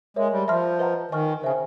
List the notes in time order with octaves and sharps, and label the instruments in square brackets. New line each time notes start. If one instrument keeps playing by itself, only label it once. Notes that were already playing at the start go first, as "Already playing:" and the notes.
[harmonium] G#3 [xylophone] A#4 C#5 E5
[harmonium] G3
[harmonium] F3 [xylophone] E5 A5 C6 F6
[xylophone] B4 D#5 F#5 A#5
[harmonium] D#3 [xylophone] D#5 G#5 C#6 F6
[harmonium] C#3 [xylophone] C5 E5 G#5